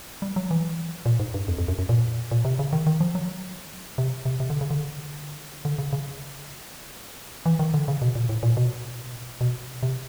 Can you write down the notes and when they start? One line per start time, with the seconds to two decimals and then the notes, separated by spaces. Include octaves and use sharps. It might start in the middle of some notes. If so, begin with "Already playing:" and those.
0.22 G3
0.36 F#3
0.51 E3
1.06 A#2
1.20 G#2
1.34 G2
1.48 F2
1.58 F2
1.68 F#2
1.79 F#2
1.89 A#2
2.31 A#2
2.45 C3
2.59 C#3
2.73 D#3
2.87 D#3
3.01 F3
3.15 F#3
3.98 C3
4.25 C3
4.40 C3
4.50 D3
4.61 C#3
4.71 D3
5.65 D3
5.78 C#3
5.93 C#3
7.46 E3
7.59 D#3
7.74 D3
7.88 C#3
8.02 B2
8.15 A#2
8.29 A2
8.43 A#2
8.57 B2
9.41 B2
9.83 C3